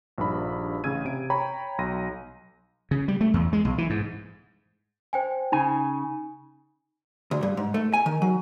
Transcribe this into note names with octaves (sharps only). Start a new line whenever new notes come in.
A#1 G2 D#4 B5
A1 C#3 C#4 E6 G#6 D#7
C3 D7
C#5 G5 A#5 B5
B1 C6 A#6 D#7
C#3
G3
A3
E2
G#3
B1
E3
G#2
C5 G5 G#5
C#3 D#4 G#5
D2
G2
G#2
A3
G#5
D#3
F#3